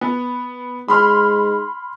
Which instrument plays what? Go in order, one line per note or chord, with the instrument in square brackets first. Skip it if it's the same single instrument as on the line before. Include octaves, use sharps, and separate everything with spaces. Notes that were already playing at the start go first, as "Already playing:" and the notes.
[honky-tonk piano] B3
[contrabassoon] G#2 [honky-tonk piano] B5 C6 F6